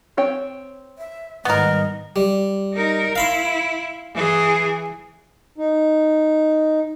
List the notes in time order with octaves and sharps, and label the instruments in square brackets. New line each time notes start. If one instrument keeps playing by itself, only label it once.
[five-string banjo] C4 C#5 G5
[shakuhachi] E5
[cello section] G#2 D#3 G3 [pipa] B3 A#4 [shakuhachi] D#5
[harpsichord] G3
[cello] D#4 A#4
[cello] E4 [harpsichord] F5 B5 C6
[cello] E3 G#4
[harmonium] D#4